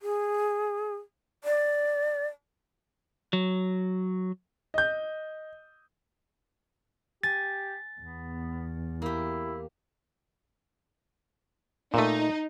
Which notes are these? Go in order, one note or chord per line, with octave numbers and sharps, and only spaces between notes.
G#4
D5
F#3
D#5 G6
G4 G#5 A6
E2 B3
A#3 E4 G4
A#2 A3 D#4